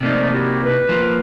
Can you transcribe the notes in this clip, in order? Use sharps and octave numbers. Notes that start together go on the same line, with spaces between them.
C3 F3 A3 A#3 D#4 D5
E4 F#4 G4
B4
F3 A#3